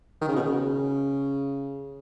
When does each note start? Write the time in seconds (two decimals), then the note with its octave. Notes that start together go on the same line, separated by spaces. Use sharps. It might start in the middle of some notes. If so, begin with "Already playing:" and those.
0.21 D#3
0.28 C#3
0.36 B2
0.42 C#3